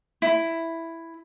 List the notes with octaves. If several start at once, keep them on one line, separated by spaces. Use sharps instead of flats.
E4